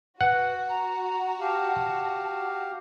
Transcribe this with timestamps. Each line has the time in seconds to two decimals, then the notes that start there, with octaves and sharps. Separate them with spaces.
0.21 F#4 B4 F#5
0.69 A#5
1.40 G4 F5 A5